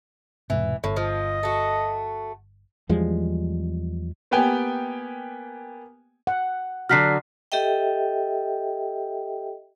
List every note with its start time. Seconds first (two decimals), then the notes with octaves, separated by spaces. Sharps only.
0.50 E1 G#2 C3 E3
0.84 G1 A2
0.97 F3 D#5
1.43 A3 F#4
2.89 E2 F3 G3 G#3
4.31 A#3 B3 G4 G5 G#5
6.27 F#5
6.89 D3 F#3 F#4 F6 B6 C7
7.52 G4 A4 D#5 E5 G5